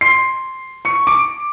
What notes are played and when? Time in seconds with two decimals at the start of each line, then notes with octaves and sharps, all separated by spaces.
0.01 C6 C7
0.85 C#6 C#7
1.07 D6 D7